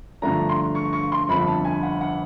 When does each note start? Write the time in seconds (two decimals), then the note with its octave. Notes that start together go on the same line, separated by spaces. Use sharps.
0.22 G2 D3 F3 A3 D4 A#5
0.49 C6
0.75 C#6
0.93 C#6
1.12 C6
1.29 G1 F2 D3 B5
1.47 A5
1.65 G#5
1.83 F#5
2.01 F#5